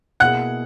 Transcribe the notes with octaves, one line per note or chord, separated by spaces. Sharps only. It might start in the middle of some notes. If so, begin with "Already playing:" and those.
B2 A#3 E4 G#4 F#5 F#6